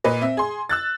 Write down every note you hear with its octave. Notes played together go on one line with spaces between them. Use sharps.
A#2 B4 D#5
C4 E5
G#4 C6
E6 F#6 A6